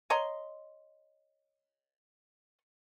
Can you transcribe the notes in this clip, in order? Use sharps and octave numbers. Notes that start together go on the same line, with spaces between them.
C#5 D#5 A#5 C6